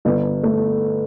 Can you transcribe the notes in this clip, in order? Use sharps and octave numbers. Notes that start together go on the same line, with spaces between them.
G1
A3